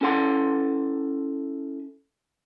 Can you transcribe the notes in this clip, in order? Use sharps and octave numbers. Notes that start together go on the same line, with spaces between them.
C#4 E4 A4 F#5 C6